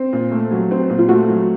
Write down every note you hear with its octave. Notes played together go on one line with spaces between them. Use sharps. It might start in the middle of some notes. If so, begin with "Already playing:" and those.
Already playing: C4
A#2
A3
F#3
C4
A#2
F4
A3 F#4
F#3